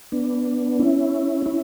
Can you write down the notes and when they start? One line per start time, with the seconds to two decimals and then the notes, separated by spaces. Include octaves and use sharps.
0.12 B3 D4
0.79 C#4 E4
1.46 C#4 E4